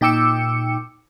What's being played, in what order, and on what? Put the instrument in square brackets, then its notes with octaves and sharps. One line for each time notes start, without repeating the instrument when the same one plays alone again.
[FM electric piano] A#2 D#4 G5 D6 E6 C#7